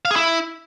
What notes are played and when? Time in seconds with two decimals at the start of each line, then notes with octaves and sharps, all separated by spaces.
0.05 F5
0.11 G#4
0.16 E4